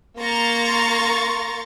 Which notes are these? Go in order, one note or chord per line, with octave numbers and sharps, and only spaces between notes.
A#3 A#5 C6 C#6 A6